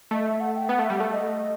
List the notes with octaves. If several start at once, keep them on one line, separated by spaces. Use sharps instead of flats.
A3 D#5
E5
F#5
G5
B3 F#5
A3 E5
G3
A3 F#5
D#5